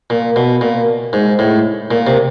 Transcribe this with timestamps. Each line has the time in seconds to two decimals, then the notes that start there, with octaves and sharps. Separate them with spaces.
0.10 A#2
0.36 B2
0.61 A#2
1.13 G#2
1.39 A2
1.91 A#2
2.07 C3